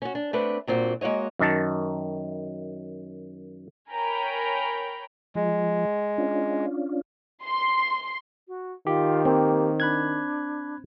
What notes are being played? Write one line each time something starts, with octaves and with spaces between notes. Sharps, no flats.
C#4 F#4
D4
A3 B3 C4 D4 B4
G2 A#2 C4 F#4
G#3 A#3 F#4 C#5 D#5
F#2 D#3 A5
A#4 C#5 G5 G#5 A#5 B5
F3 G#3
C#4 D4 F4
C6
F#4
D#3 F4 G4
A#3 C4
D4 B5 F#6 G#6